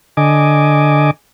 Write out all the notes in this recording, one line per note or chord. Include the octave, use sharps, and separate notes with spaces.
D3 D#5 G#5 D6